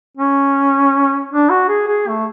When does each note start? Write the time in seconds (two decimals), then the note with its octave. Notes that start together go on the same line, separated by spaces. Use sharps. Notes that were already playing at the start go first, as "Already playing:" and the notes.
0.17 C#4
1.31 D4
1.50 F#4
1.69 G#4
1.88 G#4
2.08 A3